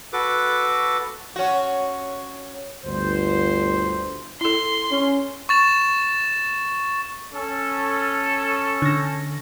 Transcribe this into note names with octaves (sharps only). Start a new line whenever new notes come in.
F#4 A4 B4 D6
C#4 F#4
G1 D2 C5
E4 A4 C6
C#4
C#6 A6 E7
C#4 A4
D3 A#6